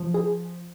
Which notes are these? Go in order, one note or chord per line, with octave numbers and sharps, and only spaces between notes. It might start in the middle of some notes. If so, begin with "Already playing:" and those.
Already playing: F3
G#4